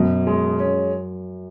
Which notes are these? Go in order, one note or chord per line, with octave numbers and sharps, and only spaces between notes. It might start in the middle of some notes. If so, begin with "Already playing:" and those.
Already playing: F#2 B2
G#3
C#4